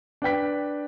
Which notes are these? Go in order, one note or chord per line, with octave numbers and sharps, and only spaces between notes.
D4 B4 G5 B6